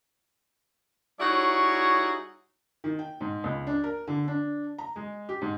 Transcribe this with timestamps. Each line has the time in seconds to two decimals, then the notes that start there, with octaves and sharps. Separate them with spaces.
1.20 G3 D#4 E4 F#4 G#4 C#5
2.84 D#3
2.99 G5
3.21 G#2
3.44 C#2
3.67 D4
3.84 A#4
4.07 D3
4.28 D4
4.78 A#5
4.96 G#3
5.29 G4
5.42 G#2